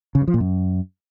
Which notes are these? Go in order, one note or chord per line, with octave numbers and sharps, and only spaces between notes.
C#3
G2
F3
A#2
F#2